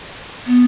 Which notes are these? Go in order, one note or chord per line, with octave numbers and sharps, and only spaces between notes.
B3